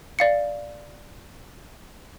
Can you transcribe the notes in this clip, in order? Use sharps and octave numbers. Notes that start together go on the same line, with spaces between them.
D5 F5 C#7